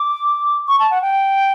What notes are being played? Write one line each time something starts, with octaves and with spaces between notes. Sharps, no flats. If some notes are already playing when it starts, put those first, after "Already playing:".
Already playing: D6
C#6
A5
F#5
G5